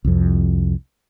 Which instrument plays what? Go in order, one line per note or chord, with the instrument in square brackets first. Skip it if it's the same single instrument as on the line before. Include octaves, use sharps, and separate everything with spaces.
[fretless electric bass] C2 F2